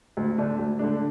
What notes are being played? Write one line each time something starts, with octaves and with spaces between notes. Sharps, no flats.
D2
D3 A3 D4
D2
D3 A3 D4